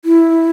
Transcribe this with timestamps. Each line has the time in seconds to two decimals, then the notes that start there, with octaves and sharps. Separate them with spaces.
0.05 E4